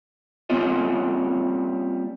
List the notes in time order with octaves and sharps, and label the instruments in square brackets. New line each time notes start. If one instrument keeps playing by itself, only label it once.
[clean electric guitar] G3 A#3 C4 C#4 F4 D#5